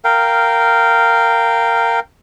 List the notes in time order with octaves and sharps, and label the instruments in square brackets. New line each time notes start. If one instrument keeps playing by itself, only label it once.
[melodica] A#4 F5 G5